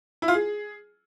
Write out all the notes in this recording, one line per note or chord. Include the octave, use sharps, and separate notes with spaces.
E4
F4
G#4